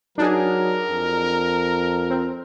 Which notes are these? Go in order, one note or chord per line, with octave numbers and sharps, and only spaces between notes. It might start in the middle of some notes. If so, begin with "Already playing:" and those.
F#3 D4 D#4 G#4 A#4
F2
C4